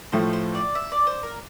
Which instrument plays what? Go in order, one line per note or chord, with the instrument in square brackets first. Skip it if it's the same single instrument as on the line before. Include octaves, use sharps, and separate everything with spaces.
[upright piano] A2 F3 A3 [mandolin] C5
[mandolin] C5
D5
E5
D5
C5
A#4